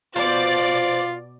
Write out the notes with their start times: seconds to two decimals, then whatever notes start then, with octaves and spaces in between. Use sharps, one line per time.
0.16 B2 F4 C5 D5 A6